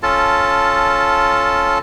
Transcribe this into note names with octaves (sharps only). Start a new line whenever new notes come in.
C#4 F4 A4 A5